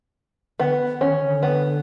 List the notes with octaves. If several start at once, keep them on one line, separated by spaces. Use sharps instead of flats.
D3 B3
D#3 C#4
D3
B3